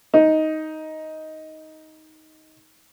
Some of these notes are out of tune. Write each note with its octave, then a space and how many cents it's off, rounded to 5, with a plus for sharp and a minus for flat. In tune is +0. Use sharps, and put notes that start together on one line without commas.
D#4 +10